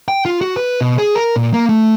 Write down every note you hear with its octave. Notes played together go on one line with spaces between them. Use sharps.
G5
F4
F#4
B4
B2
G#4
A#4
A#2
A#3
A3